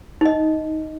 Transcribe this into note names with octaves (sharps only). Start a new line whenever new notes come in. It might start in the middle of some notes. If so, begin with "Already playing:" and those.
D#4 D#5